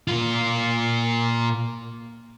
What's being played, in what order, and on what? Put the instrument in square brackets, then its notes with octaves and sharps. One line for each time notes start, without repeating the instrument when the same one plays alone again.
[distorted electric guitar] A#2 F4